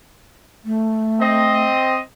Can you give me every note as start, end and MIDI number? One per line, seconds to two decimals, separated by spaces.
0.65 1.63 57
1.20 1.99 60
1.20 1.99 75